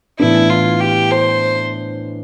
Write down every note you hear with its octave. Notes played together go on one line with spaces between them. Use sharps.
A2 E3 B3 D4 E4
F4
G4
C5